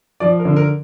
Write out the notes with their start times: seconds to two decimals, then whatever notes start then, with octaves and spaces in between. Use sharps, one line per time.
0.20 F3 D5
0.39 A#4
0.45 D3
0.56 A#4